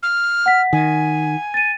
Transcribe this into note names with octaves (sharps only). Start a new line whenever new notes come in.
F6
F#5 B6
D#3 G#5
A6 D#7